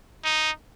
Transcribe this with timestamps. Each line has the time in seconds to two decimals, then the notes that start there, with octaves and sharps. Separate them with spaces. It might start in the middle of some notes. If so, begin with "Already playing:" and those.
0.24 D#4